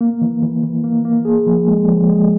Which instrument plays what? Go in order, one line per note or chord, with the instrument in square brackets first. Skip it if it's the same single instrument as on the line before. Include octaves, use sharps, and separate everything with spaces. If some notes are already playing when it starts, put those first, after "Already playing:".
[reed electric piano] A#3
E3
E3
E3
A#3
A#3
G#4
F3
G#3
F3
G#3